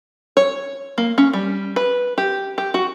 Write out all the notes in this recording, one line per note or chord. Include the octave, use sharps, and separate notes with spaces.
C#5
A#3
C#4
G3
B4
G4
G4
F#4